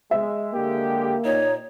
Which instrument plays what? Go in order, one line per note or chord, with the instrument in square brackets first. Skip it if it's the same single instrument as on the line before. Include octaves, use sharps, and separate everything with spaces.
[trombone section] G#3 [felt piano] E5
[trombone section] D3 G#3 G4 [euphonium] A#3
[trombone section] A#2 D#4 [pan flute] C#5